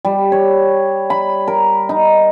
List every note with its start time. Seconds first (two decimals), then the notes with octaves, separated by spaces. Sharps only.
0.05 G3
0.32 C#5
1.10 B5
1.48 A#4
1.89 D#4